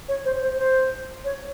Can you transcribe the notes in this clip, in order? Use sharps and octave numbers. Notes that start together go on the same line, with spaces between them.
C#5
C5
C5
C5
C#5